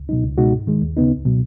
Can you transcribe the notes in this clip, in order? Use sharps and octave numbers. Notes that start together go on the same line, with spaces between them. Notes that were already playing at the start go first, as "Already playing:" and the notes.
Already playing: C#2
B2 F#3 D#4
C#2
B2 G#3 D#4 F#4
G#2
D#3 G#3
D#2
C#3 B3 D#4
C#2
B2 F#3